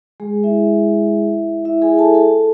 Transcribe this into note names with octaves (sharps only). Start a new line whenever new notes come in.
G#3 G#4
E4 E5
E4 E5
G#4 G#5
A4 A5
A4 A5